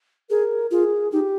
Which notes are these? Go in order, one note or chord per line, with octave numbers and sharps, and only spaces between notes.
G#4 A#4
F4 G#4
D#4 G4